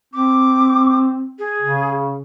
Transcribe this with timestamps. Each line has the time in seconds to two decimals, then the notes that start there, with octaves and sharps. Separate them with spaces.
0.13 C4 D6
1.39 G#4
1.61 C#3